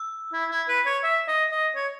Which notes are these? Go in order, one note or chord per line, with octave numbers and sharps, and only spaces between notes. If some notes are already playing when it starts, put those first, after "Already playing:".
Already playing: E6
E4
E4
B4
C#5
E5
D#5
D#5
C#5